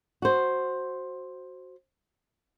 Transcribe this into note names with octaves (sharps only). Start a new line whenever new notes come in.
F#4 C5